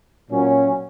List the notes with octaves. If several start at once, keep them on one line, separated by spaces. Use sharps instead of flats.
A#2 F#3 C#4